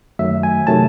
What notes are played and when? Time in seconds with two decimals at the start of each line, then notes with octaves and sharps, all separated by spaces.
0.19 F#2 D#3 F#3 A3 E5
0.43 G#5
0.67 C3 D#3 F#3 A3 A5